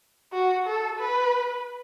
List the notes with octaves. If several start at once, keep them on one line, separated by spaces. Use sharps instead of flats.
F#4
A4
B4